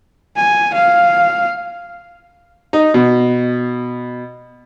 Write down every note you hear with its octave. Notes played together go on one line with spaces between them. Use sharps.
G#5
F5
D#4
B2